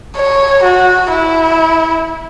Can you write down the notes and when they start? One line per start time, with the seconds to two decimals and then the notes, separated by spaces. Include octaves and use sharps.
0.17 C#5
0.64 F#4
1.11 E4